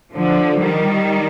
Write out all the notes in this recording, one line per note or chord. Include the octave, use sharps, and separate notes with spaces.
D3 F3
D#3 G3